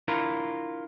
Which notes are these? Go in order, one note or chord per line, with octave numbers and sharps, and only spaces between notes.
D4 E4 F4 A#4 A#5